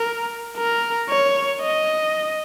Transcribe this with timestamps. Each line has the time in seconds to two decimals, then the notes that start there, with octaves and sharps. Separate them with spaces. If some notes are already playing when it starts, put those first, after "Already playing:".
Already playing: A#4
0.58 A#4
1.09 C#5
1.61 D#5